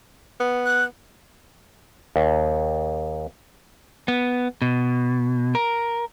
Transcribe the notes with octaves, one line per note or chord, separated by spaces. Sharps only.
B3
F#6
D#2
B3
B2
A#4